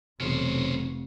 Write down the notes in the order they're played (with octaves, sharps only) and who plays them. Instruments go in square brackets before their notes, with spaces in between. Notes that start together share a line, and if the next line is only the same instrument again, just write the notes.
[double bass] F1 [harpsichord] B1 E2 [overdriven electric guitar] C#4 C5